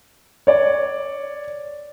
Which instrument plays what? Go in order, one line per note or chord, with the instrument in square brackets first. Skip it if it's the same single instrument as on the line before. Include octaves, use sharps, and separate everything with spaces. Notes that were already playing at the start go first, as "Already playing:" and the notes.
[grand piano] C#5 D5